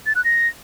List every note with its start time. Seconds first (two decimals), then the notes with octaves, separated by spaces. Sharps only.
0.06 A6
0.15 F#6
0.24 A#6